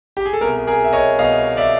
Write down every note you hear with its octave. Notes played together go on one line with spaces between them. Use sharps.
G4
G#4
A4
C2 B2 G#4 A#4
G#4 A#4
E5
C#5 D#5
C2 B2 D#5 F5
D5 E5